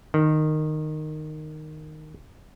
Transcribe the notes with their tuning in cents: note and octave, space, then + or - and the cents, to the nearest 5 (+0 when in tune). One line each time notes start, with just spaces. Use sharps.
D#3 -15